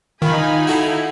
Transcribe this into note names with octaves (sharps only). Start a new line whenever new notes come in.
D#3 D#4 F4 G#5 B5
E4 F#4 A4 F5